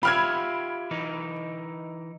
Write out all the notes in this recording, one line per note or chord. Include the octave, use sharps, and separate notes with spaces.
F4 G4 E5 B5 F6 G#6
E3 D#4